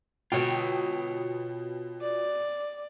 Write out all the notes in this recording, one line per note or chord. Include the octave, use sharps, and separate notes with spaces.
B2 F4 C#5 G5
D5